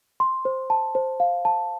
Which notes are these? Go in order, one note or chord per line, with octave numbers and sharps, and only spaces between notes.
C6
C5
A5
C5
F5
A5